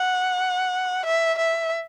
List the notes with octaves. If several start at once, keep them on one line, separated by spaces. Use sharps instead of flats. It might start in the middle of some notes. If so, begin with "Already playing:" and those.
Already playing: F#5
E5
E5